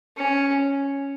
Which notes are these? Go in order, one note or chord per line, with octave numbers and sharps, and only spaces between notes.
C#4